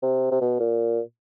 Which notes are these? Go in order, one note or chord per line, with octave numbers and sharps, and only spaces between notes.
C3
C3
B2
A#2